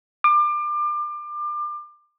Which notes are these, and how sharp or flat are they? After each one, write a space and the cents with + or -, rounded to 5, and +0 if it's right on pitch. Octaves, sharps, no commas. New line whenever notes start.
D6 +30